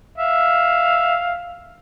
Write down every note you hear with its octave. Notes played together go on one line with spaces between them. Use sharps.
E5 F5